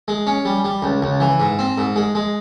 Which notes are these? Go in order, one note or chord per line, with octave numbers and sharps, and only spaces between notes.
G#3
C#4
G3
G3
C#2
C#2
E3
G#2
C4
G#2
G#3
G#3